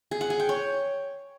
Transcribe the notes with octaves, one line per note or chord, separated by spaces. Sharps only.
G#4
F#5
G#4
G5
C#5